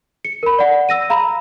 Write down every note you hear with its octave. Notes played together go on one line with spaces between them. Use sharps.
C#7
A#4 B5
D5 F#5
E6 A#6 D#7
F5 A#5 B5